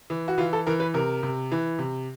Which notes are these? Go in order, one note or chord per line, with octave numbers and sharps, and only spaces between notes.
E3
F#4
E3 F4
A4
E3 A#4
B4
C3 A#4
C3
E3
C3